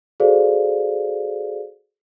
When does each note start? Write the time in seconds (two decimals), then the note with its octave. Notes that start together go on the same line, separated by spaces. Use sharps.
0.20 F#4 G#4 A4 C5 D5 F5